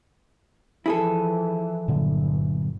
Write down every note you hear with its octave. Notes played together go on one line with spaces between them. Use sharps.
E3 F3 E4 G#4 A4
G1 A#2 D3 F#3